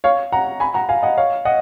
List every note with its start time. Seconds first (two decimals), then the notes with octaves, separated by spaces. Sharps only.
0.04 C#5 F5
0.32 F#5 A#5
0.60 G#5 B5
0.74 F#5 A#5
0.89 F5 G#5
1.03 D#5 F#5
1.17 C#5 F5
1.45 D#5 F#5